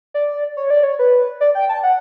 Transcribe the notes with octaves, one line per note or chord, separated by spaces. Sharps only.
D5
C#5
D5
C#5
B4
D5
G5
A5
F#5